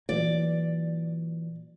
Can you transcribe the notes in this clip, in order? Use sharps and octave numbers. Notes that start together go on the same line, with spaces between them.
A#2 E3 F#3 D5